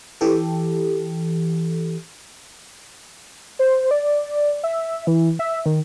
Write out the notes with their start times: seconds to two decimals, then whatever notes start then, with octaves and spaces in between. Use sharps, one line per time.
0.21 E3 G4 A4
3.59 C5
3.91 D5
4.64 E5
5.07 E3
5.39 E5
5.66 D#3